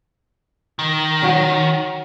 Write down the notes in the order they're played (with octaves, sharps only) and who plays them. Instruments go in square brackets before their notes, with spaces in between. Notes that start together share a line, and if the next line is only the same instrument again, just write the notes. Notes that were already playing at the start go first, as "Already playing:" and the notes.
[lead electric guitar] D#3
[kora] F#3 C#4